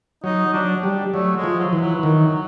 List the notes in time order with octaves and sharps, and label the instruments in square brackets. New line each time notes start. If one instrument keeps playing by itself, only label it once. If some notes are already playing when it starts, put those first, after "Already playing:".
[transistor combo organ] F#3 [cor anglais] D#4
[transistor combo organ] F#3 [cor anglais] D4
[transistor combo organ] G3
[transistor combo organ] F#3 [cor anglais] A3
[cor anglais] G#3
[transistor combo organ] F3
[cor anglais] F#3
[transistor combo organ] E3
[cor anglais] F#3
[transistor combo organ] D#3